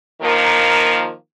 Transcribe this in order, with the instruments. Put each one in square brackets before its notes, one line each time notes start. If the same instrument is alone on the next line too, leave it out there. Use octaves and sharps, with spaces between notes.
[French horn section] D#3 F3 A#3 A#4